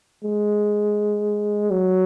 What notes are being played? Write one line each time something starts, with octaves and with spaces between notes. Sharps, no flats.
G#3
F#3